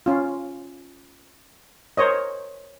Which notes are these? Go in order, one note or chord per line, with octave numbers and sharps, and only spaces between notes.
C#4 F4
A#4 C5 C#5 D#5